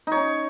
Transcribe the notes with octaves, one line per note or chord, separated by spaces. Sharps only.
C#4 D#4 C#5